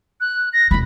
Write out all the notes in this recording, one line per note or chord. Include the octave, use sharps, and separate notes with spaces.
F#6
A#6
E1 G#3 B5